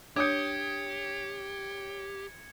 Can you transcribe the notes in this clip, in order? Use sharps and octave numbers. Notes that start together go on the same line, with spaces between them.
D4 G4 C#5 D#6 G6 G#6 C#7